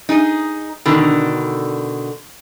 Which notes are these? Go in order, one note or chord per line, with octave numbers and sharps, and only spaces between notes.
D#4 G#4
B2 D3 D#3